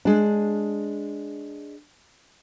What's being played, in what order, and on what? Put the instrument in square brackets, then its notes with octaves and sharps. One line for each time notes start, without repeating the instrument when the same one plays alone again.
[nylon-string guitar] G#3 D4